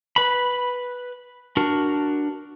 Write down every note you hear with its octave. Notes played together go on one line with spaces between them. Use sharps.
B4 B5
D4 F#4 A#4